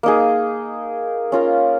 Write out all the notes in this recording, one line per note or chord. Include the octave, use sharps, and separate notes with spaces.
A#3 D#4 G#4
C#4 F4 A#4